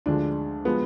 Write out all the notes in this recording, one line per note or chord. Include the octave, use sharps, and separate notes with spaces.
D2 D3 F3 G#3 D4
F3 G#3 B3